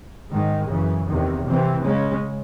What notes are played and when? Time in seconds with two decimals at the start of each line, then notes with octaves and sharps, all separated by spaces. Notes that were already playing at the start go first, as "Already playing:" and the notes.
0.31 G#2 D#3 G#3
0.69 F#2 C#3 E3
1.08 E2 C3 D#3
1.46 C3 E3 C4
1.84 C#3 G#3 C#4